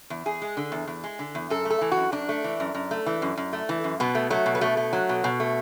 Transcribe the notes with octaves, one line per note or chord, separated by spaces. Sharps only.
E2
E2 G#4
G#3
D3
E2
E2
G#3
D3
E2
F#2 A4
A3
A4
E3
F#2 F#4
F#2 D4
A3
E3
F#2
F#2
A3
E3
F#2
F#2
A3
E3
F#2
B2 B3
A3
F#3 A3
B2
B3
B2 A3
A3
F#3
B2
B2
A3